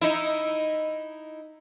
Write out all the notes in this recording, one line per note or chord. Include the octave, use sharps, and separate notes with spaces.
D#4 E4